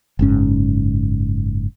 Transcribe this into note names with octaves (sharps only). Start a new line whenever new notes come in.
F#1 G#2 C#4